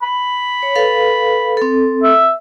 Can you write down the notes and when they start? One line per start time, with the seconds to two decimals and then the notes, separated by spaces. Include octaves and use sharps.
0.03 B5
0.63 C#5
0.76 A4 B4 F5
1.57 C4 A4
2.03 E5